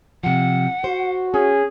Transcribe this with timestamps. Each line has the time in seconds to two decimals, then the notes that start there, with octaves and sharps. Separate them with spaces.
0.23 C3 F3 F#5
0.84 F#4 C5
1.34 C#4 G#4